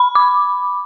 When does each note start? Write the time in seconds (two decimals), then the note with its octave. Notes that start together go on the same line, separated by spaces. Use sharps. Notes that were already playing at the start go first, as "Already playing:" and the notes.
Already playing: B5
0.15 D6